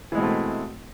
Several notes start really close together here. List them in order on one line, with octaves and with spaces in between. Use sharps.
E3 G#3 B2 C4 A3